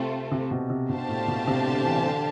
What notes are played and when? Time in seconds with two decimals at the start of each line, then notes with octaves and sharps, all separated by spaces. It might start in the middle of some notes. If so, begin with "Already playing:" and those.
Already playing: C3 A3 C4 F4 A4
0.32 C3
0.51 B2
0.70 C3
0.89 B2 D4 G4 C5 F5 A5
1.08 A2
1.28 B2
1.47 C3
1.66 D3
1.85 E3
2.05 D3